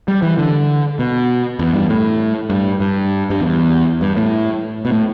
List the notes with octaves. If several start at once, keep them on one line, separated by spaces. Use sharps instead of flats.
G3
E3
D3
B2
E2
G2
A2
G2
G2
G2
E2
G2
A2
B2
A2